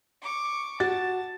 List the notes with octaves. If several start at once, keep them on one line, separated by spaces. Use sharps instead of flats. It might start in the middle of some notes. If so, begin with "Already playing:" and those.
C#6 D6
F#4 A5 A6